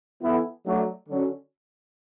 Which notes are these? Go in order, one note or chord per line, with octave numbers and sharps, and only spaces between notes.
E3 B3 E4 A4
F#3 A3 D4
D3 F#3 C#4